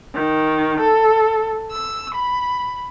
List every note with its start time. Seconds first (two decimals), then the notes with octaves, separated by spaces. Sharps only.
0.15 D#3
0.81 A4
1.71 E6
2.15 B5